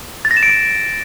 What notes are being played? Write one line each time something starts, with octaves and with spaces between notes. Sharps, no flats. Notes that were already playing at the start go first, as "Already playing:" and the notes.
A6
A#6
E7
D7